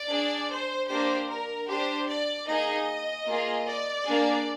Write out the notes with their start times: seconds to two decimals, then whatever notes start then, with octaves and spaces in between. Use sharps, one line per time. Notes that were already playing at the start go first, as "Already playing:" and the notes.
Already playing: D5
0.09 D4 G#4
0.49 C5
0.88 A#3 D4 G4 C5
1.29 A#4
1.68 D4 G4 C5
2.08 D5
2.46 A#3 D#4 G#4 D#5
3.27 A#3 F4 G#4
3.66 D5
4.06 A#3 D4 G#4